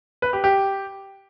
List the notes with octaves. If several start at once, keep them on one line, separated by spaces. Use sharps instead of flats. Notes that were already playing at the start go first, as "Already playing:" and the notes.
B4
G4
G4